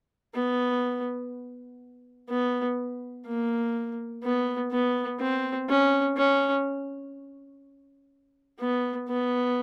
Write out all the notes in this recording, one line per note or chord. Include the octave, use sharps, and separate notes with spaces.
B3
B3
A#3
B3
B3
C4
C#4
C#4
B3
B3